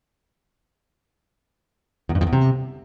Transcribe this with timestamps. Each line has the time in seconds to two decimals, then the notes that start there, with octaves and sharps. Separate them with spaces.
2.09 E2
2.15 G2
2.21 F2
2.27 E2
2.33 C3